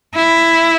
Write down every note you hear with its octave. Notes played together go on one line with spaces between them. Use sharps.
E4